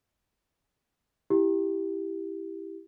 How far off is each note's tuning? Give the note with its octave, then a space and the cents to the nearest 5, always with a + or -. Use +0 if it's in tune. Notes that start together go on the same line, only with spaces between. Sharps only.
E4 +0 G4 +0